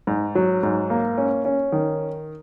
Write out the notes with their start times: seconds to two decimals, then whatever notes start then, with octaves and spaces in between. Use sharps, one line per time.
0.07 G#2
0.35 F#3
0.63 G#2
0.90 A#3
1.18 C#4
1.45 C#4
1.72 D#3